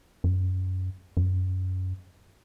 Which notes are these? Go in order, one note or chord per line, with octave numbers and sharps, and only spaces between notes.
F#2
F#2